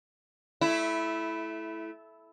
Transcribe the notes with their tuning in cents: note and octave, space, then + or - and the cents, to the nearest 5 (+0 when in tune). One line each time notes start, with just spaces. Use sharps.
A3 -20 E4 +0